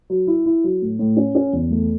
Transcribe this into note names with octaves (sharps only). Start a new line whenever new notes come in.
F#3
E4
E4
F#3
A2
A2
C#4
C#4
E2
A3